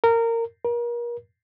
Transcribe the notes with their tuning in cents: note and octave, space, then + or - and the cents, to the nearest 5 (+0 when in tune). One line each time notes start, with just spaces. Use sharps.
A#4 -20
A#4 +35